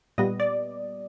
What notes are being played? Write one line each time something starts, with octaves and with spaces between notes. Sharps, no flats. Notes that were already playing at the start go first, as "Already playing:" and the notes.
A#2 G3 B3 D#5
D5